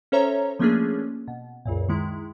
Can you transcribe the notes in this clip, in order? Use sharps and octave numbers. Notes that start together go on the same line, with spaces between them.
C#4 A4 C5 C#5 E5 A#5
F3 A3 A#3 C#4 D4 G#4
B2
C#2 F#2 A#2
D#3 G#3 E4